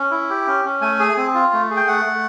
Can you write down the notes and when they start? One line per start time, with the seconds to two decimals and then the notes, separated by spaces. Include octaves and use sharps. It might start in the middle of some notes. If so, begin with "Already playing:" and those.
Already playing: C#4
0.11 E4
0.30 G4
0.47 C#4
0.65 C#4
0.81 A3 G#5
0.99 G#4
1.17 C4
1.34 F4
1.53 A3
1.70 G#4
1.76 G5
1.87 A3 F#5
2.05 A3